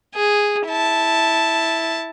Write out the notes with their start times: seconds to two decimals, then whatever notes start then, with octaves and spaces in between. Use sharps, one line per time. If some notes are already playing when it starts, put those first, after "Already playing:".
0.15 G#4
0.67 E4 A5